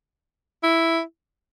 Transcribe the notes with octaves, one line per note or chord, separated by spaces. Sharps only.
E4